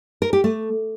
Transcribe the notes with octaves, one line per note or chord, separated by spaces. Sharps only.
A#4
G4
A3